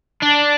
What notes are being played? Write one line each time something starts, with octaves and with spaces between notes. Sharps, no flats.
D4